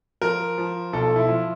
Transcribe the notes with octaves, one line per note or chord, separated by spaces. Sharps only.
F3 A#4
F3
B1 A4
E4
F3